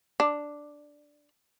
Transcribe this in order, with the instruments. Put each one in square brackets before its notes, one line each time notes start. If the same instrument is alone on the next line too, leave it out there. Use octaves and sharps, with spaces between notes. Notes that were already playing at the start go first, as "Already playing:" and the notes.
[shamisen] D4